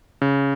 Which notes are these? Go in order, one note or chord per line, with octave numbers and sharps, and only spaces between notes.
C#3